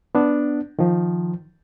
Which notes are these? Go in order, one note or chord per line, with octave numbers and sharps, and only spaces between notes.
B3 D4
D#3 F3